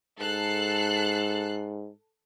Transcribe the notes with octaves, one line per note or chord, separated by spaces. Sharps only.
G#2 A4 F#6 C7